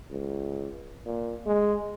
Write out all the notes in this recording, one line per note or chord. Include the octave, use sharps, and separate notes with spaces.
C#2
A#2
G#3